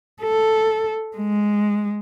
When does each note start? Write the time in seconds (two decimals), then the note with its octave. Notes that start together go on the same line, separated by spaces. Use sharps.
0.22 A4
1.17 G#3